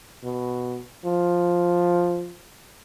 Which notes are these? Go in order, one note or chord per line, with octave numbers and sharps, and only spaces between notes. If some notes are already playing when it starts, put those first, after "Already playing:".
B2
F3